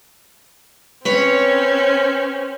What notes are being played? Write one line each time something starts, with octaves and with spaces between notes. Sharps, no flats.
C4 C#4 B4 C#5